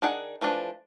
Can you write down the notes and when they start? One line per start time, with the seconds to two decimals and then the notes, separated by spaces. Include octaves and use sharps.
0.02 D#3 D4 G#4 F#5
0.41 E3 F3 A3 D4